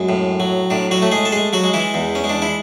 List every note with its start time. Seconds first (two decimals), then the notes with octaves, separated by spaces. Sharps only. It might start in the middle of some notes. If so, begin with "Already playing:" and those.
Already playing: F#2 G#3
0.09 A2
0.40 F#3
0.70 A2 D4
0.91 F#3 F#4
1.02 A3
1.12 G#3 G#4
1.25 A4
1.32 G#3 G#4
1.53 F#3 F#4
1.64 G#3
1.73 E3 E4
1.94 E2
2.15 C#4
2.24 G#3
2.29 D4
2.42 E4